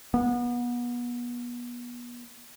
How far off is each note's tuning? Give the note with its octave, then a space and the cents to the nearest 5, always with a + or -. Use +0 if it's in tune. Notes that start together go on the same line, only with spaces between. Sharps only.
B3 -30